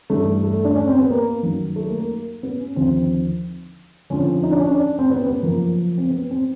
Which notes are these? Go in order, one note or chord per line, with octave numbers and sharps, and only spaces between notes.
G2 E3 A3
A3
D4
C#4
C4
B3
A#3
F#2 D#3 F#3
A3
A#3
A#3
B3
C#4
D#2 D3 F3 C4
F2 D3 F3 C#4
D#4
D4
C#4
D4
C4
B3
B3
F#2 C#3 F3 A#3
C4
B3
C4